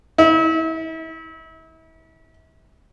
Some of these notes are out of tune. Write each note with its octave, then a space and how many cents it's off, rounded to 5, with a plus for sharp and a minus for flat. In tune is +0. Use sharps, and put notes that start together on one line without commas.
E4 -35